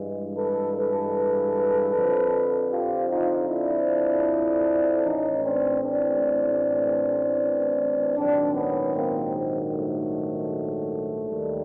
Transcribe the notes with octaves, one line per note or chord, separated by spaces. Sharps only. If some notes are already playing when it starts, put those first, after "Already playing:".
Already playing: G2 E3 G#3
A4 B4
A4 B4
F2 D3 F3
F4 G4
D#4 F4
D4 E4
A1 A2 E3 C#4 D#4
C4 D4
C4 D4
A#1 G#2 D#3 F#3 C4 D4
B3 C#4
A#3 C4
A3
D#2 D#3 G3